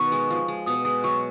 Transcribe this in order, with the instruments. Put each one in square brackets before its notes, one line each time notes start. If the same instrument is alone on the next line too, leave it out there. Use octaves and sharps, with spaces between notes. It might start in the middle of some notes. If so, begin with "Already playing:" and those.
Already playing: [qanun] B2 D#3 [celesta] C#6
[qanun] G#3
F3
G#3
[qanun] B2 [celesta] D#6
[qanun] G#3 [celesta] D#6
[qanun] F#3 [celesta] C#6